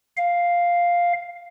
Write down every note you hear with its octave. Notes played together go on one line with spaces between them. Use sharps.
F5